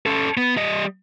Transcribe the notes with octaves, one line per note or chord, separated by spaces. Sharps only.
C#4 A4
B3
G3 D#5